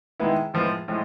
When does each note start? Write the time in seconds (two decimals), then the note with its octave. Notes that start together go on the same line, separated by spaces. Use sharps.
0.20 D#3 G#3 B3 E4
0.54 A2 F3 G#3 B3
0.88 A2 F3 G#3